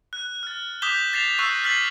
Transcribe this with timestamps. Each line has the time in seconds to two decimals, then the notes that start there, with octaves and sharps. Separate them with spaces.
0.13 F#6
0.43 F6 A6
0.82 D6 D#6 G6 B6 E7 G7
1.13 A6 A#6 C7 E7 F7 G7
1.39 C#6 E6 F#6 A6 C7
1.64 F6 A6 B6 C7 F#7